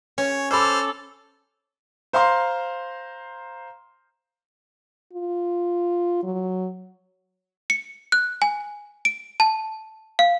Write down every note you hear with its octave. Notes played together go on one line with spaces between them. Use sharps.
C#4 C#5
A4 C5 B5 D6 E6 F6
C5 F5 A#5 C6
F4
F#3
C#7
F#6
G#5
D7
A5
F5